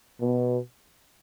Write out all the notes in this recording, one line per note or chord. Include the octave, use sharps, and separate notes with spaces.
B2